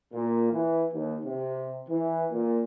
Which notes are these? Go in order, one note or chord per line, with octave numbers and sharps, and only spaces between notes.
A#2
E3
D#2
C3
E3
A#2